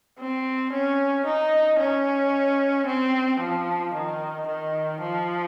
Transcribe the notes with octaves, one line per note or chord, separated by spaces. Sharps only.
C4
C#4
D#4
C#4
C4
F3
D#3
D#3
F3